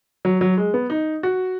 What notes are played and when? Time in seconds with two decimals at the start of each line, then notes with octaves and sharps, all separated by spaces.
0.25 F#3
0.41 F#3
0.57 G#3
0.74 B3
0.90 D#4
1.23 F#4